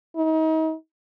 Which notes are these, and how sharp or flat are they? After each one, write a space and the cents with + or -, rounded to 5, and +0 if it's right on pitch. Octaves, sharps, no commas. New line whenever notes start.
D#4 +35